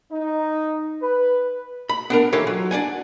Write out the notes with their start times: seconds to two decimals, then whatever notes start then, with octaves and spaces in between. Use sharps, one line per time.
0.11 D#4
1.01 B4
1.89 B5
2.10 B3 D4 A#4
2.32 E3 D#4 F4 G4 A4 C#5
2.47 F#3
2.71 D4 D5 F#5 G#5